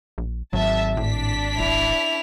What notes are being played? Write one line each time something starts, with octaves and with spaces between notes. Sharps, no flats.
A#1
G#1 F#3 E5 A5
A2 D4 B6
D#1 E4 F7